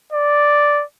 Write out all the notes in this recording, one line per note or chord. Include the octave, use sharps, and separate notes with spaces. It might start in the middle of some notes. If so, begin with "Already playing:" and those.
D5